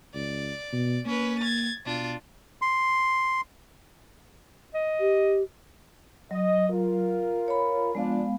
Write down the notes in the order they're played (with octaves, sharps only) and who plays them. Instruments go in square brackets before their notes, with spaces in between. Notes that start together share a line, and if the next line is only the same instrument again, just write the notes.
[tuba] C#2 [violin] D5
[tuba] B2
[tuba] A#3 [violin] C#4 B4
[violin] G#6 A6
[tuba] B2 [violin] D4 F4
[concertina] C6
[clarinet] D#5
[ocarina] G4
[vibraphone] F#3 [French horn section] D#5
[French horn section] F4 A#4
[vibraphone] C#5 B5
[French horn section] F3 D4 [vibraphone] G#3 B3 F5